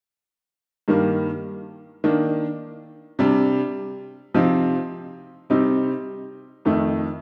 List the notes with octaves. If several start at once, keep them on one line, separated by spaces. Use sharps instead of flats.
G2 D#3 G3 A#3
D#3 A#3 D4
C3 G3 D4
C3 F3 C4 D#4
C3 G3 C4 D#4
F2 D#3 A3